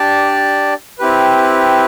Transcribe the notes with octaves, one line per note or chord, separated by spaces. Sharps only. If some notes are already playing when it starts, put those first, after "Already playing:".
Already playing: D4 G4 D5 A5
C4 E4 G4 B4